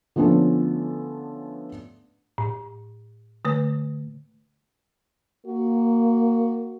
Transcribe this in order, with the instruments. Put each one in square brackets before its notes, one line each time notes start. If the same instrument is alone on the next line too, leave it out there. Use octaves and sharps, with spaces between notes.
[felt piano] D3 F3 A3 B3 C#4
[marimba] A2
D3 A3 B4
[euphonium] A#3 [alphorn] F#4